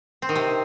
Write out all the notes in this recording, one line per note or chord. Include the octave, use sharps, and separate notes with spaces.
C4
D#3
C3